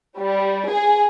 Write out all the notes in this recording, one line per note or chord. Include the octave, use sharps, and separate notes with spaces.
G3
G#4